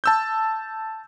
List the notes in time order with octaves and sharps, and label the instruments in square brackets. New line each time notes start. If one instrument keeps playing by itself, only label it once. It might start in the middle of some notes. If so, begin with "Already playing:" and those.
[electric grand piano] A5 E6 G6